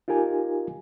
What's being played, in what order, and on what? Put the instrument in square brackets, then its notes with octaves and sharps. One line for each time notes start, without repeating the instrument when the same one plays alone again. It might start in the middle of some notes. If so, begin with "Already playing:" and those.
[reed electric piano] D#4 F4 G4 A#4 G#5